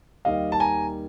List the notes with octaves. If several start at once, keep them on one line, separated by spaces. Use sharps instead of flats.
D#2 D#3 G3 D#5 F5
A5
G#5 A#5